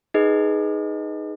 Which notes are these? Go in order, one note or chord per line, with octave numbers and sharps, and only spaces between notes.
D#4 G#4 B4 D#5